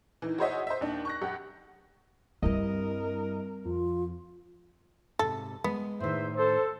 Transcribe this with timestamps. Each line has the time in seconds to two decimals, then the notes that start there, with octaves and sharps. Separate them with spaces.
0.22 D#3 E3
0.38 F#4 G#4 C5 C#5 D#5 E5
0.67 C5 D#5 E5
0.81 D#2 D4
1.05 C#6 F#6 A#6
1.21 F#2 G4 F#5
2.43 G2 G3 C4 E4 A#4 D#5
3.66 F2 F4
5.19 G#2 C3 A4
5.64 G#3 B3
6.00 E2 A2 D#3 C5 E5
6.37 A4 C5